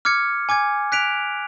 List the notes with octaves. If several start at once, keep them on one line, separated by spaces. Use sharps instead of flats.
D6 F6 G#6 C#7
G#5 D6 G#6
F#6 B6 D7 F7